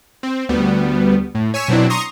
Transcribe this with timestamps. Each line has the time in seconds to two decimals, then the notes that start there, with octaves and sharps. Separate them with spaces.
0.23 C4
0.49 D2 G3 B3
1.35 A2
1.54 C#5 G#5 C#6 E6 B6
1.68 B2 F#3 C4 D4 E4
1.90 A#5 C6 C#6 D#6 A#6